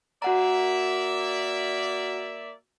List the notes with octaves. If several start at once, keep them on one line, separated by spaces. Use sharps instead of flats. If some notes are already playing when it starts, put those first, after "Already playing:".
A#3 F#4 D5 E5 F#5 A#5